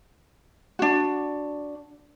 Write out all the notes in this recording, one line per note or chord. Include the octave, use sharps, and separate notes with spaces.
D4 F#4